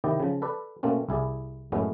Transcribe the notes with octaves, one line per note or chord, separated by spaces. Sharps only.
C3 D#3 E4 D5 D#5 G5
C#3 F3
A4 B4 D5
B2 A3 A#3 C4 C#4
C2 E4 G#4 D5
F#2 A2 G#3 A3 B3 C#4